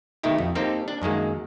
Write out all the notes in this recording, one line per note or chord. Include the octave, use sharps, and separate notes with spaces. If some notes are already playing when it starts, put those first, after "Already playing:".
B2 D#3 A3 D#4 E4 G4
F2
A#3 C4 D#4 G4 A4 C5
D4
F#2 D#3 G#3 A#3